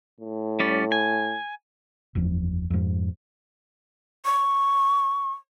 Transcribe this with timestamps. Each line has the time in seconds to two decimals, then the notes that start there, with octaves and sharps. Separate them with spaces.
0.21 A2
0.60 G3 C#4 D5
0.92 G#5
2.15 F#1 E2 F3
2.70 F2 G#2
4.25 C#6